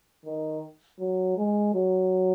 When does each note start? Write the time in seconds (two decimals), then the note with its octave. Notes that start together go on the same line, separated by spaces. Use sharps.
0.26 D#3
0.99 F#3
1.37 G#3
1.74 F#3